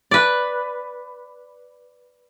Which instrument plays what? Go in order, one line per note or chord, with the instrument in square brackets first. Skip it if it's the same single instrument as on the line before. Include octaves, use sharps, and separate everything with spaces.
[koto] B4 D5